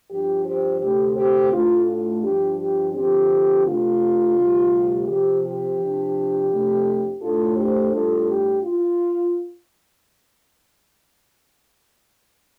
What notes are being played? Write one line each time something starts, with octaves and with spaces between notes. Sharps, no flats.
G2 F3 D4 G4
G4 C5
D2 C3 A3 C4 G4
G4 C5
A2 A3 D4 F4
F4
G2 F3 D4 G4
G4
G2 D3 F3 C4 G4
C3 A3 D4 F4
D2 C3 G3
C3 F3 C4 G4
G4
C3 F3 D4
F2 C3 A3 D4
A2 A3 D4 F4 A4
G4 C5
A2 G3 D4 F4 A4
G4
F4